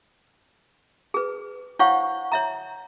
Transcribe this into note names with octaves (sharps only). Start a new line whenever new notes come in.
G#4 B4
E4 C5 C#5 F5 F#5 C#6
C#5 E5 A#5